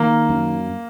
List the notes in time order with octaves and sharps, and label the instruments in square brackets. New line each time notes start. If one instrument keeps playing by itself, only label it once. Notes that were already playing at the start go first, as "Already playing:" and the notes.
Already playing: [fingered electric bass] D#3 [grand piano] A#3
[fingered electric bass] F#2